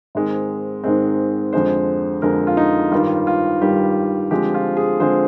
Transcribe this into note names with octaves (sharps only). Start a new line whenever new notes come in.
G#2 D#3 G#3 C4
G#2 D#3 G#3 C4
F2 D3 G#3 C5
F2 D3 G#3 A#4
F4
D#4
G2 D#3 G3 F4
F4
G2 D#3 G3 G4
D3 F3 G#3 C4 G4
F4
G#4
D3 F3 G#3 C4 C5